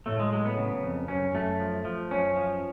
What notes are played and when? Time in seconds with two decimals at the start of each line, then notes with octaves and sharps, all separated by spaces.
0.06 A2 A3
0.19 G#3
0.32 F#3 G#3
0.45 B3
0.58 C#3
0.83 F2
1.08 F#2 C#4
1.35 F#2 A3
1.59 F3
1.85 F3
2.11 F#2 C#4
2.36 F3